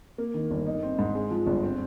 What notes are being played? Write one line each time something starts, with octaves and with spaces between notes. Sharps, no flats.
A#3
D#3
G1
D#4
C4
G#2
G#3
F3
G1
C4